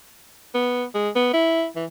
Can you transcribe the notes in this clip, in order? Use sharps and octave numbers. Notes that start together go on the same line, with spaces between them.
B3
G#3
B3
E4
E3